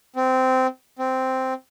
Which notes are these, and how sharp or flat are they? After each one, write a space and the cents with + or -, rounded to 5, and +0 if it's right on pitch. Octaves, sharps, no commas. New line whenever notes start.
C4 -15
C4 -5